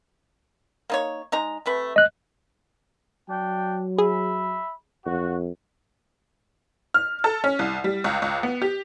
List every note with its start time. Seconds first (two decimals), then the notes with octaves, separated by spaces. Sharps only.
0.90 A#3 D#4 C#5
1.32 G#3 D#4 A#5
1.66 C3 A3 B4
1.96 D#5 F#6
3.29 F#3 D4 G5
3.98 G#4 E5 B5
5.06 F2 F#4
6.94 F6
7.24 A4
7.44 C#4
7.59 C2
7.84 G3
8.04 C#2
8.22 C#2
8.43 B3
8.62 G4